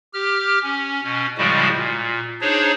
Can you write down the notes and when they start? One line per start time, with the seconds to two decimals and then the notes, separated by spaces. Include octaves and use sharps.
0.14 G4 F6
0.63 C#4
1.03 B2 C#4
1.38 A2 C#3 F3 G3 G#3 F#4
1.76 A#2
2.41 D4 D#4 G#4 C5 C#5